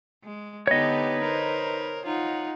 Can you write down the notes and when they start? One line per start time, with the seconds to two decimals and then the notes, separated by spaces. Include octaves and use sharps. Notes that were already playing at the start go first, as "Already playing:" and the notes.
0.24 G#3
0.67 D3 B3 D#4 G4 B4 C#5 D#5
1.21 A#4 C5
2.06 D#4 F4 F#5